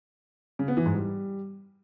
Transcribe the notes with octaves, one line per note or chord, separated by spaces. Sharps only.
C#3
B3
E3
G#2
G3